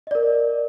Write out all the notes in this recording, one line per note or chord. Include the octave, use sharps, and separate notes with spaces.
A#4 D5 D#5